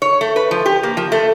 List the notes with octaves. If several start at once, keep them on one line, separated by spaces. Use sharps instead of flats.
C#5
A3
B4
F3
G4
A#3
F3
A3